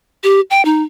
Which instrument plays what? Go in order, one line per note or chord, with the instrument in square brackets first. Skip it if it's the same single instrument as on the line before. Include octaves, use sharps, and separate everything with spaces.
[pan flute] G4
G5
D#4